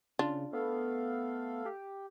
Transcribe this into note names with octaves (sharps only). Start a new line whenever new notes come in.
C#3 D4 F4
A3 B3 A4 F5
G4